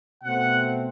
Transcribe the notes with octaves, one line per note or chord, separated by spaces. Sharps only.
B2 A3 C4 F#5